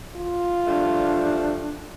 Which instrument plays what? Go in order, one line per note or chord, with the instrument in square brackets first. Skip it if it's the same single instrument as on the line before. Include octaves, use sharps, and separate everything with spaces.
[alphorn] F4
[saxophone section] F3 G3 A3 [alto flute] D4